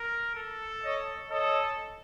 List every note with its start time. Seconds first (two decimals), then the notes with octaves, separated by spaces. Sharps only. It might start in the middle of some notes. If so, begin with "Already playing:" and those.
Already playing: A#4
0.35 A4
0.82 C#5 D#5
1.30 A4 C#5 D#5